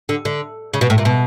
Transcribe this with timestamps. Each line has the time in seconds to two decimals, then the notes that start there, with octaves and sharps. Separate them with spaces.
0.09 D3
0.25 D3
0.74 C#3
0.81 B2
0.90 A2
0.98 A#2
1.05 B2